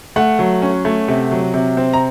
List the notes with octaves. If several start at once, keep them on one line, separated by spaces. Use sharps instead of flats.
A3 F#5
F#3
C#4
A3
C3
F#3
C3
C4
A#5